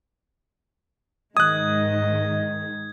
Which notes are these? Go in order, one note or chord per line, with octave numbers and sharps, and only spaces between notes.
G#2 D#3 G#3 D#5 D#6 F#6 G#6